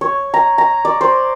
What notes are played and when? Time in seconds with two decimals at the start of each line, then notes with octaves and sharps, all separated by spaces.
0.01 C#5
0.34 A#5
0.58 A#5
0.85 D5
1.01 C5